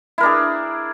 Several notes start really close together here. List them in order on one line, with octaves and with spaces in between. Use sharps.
E4 A#4 D4 G#4